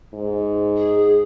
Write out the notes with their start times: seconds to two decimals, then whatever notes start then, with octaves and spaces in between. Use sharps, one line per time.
0.13 G#2
0.77 G#4